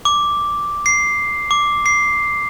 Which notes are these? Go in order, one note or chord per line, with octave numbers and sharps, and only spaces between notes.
D6
C7
D6
C7